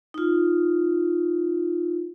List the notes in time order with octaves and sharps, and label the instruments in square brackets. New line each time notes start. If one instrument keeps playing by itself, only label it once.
[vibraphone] D#4 F4